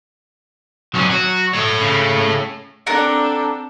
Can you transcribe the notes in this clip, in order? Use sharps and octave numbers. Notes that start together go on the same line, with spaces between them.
B1 F#3 C#4
F#4
A3 C#5
C#3
C4 D4 A4 A#4 F#5